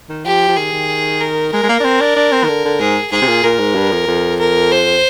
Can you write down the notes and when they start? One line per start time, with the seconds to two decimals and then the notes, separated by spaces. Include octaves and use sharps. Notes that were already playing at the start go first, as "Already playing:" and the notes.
0.09 D#3
0.26 F3 G4
0.48 F3
0.57 D#3 G#4
0.73 D#3
1.21 A#4
1.53 G#3 A#4
1.63 G#3
1.69 A#3
1.80 D4
1.84 C4
2.01 D4
2.16 D4
2.32 C4
2.44 D#3
2.49 D3
2.65 D3
2.80 G#2 G#4
3.12 G#2 G#4
3.22 C3
3.27 A#2
3.44 A#2 A#4
3.59 G#2
3.75 G2
3.92 F2
4.07 F2
4.39 A#4
4.71 C5